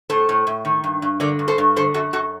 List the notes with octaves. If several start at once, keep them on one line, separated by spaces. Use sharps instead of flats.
A2 A4 C5
A2
A2
D#3
G2
G2
D3 A#4 D5
G2
A4 C5
G2
D3 A4 C5
F#2 F#4 A4
F#2 F#4 A4